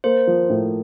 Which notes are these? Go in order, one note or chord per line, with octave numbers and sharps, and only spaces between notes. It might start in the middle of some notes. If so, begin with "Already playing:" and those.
A#3 C5
F3
A2